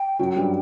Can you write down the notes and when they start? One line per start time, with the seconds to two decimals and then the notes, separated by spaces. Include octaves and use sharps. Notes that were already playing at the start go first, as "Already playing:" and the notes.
Already playing: G5
0.19 F#2 F#3
0.36 G2 G3